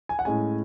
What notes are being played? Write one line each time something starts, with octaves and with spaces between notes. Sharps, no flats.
G#5
F#5
A2 G#3 C#4 G#5